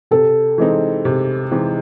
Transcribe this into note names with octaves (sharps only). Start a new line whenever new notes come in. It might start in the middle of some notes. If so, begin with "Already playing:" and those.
C3 A4
E3 G#3 C4 D#4
C3
E3 G#3 C4 D#4